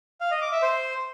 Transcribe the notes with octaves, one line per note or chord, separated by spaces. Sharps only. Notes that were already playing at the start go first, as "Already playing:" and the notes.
F5
D#5
D6
E5
C5